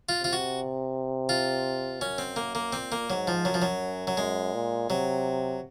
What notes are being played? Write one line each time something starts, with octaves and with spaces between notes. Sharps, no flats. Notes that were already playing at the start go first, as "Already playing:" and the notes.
F4
C3 F4
F#4
F4
F#2 C#4
C4
A#3
A#3
A#2 C4
A#3
G#2 F#3
F3
F#2 F#3
F3
F#3
F#3
F#2 G#3
A#2
C3 F#3